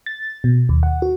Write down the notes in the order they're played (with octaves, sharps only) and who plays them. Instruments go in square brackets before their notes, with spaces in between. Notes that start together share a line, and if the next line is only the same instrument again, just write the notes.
[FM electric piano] A6
B2
D#2
F#5
F#4